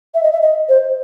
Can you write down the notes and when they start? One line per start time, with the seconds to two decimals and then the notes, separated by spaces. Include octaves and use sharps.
0.14 E5
0.23 D#5
0.32 E5
0.42 D#5
0.68 C5